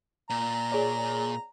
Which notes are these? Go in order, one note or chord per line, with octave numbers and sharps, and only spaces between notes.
A#2 A#5
G#4 C#5 D5